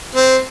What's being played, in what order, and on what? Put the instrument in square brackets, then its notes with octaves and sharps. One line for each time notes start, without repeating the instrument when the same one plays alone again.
[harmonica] C4